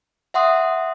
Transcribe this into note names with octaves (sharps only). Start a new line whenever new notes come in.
E5 F#5 C6 D#6